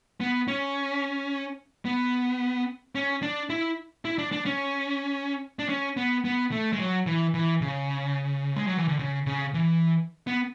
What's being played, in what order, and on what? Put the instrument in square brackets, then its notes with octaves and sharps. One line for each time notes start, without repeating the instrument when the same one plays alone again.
[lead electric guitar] B3
C#4
B3
C#4
D4
E4
E4
D4
D4
C#4
D4
C#4
B3
B3
A3
G#3
F#3
E3
E3
C#3
G#3
F#3
E3
D3
C#3
C#3
E3
B3